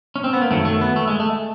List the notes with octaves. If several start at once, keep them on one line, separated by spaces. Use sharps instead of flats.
C#4
C4
B3
A#3
F#2 D#3 F#3 A3
A3
B3
A3
G#3
A3